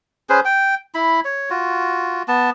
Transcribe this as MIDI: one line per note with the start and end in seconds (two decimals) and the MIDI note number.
0.29 0.40 61
0.29 0.40 68
0.29 0.40 71
0.29 0.40 72
0.45 0.75 79
0.95 1.20 64
0.95 1.20 83
1.25 1.49 73
1.50 2.23 65
1.50 2.23 66
2.28 2.50 59
2.28 2.50 81